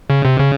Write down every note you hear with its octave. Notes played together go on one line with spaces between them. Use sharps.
C#3
C3
C#3